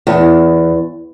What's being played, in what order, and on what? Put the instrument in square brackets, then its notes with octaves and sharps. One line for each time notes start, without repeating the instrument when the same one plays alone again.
[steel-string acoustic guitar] E2